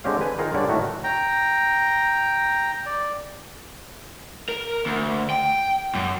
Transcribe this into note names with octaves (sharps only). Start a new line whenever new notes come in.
D3 G#3 C4 G4 C#5 F5
B4 G#5
D#3 D#4 F4 G#4 A#4
D3 G3 C#5 D5
A2 D#3 A3 F#4
G5 A#5
D5
A#4
D2
G5
F#2